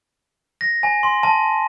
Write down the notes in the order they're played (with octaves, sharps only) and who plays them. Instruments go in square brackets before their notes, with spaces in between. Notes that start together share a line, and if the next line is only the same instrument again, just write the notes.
[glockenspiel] A#6
G#5
C6
A5